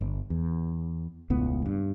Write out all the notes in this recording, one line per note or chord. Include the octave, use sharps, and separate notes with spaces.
G1
E2
E1 C#2 A2 B3
G2